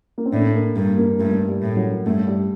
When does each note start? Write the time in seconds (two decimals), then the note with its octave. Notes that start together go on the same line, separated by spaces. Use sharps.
0.18 A#3
0.26 C4
0.32 A2 D4
0.54 A#3
0.76 G2 A#3
0.98 A#3
1.19 G2 A3
1.48 G3
1.62 A2
1.76 F#3
2.06 G2 A3
2.27 G3